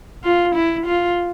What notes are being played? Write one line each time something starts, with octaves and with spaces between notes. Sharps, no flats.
F4
E4
F4